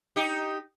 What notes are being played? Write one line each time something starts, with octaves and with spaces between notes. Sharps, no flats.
D#4 G4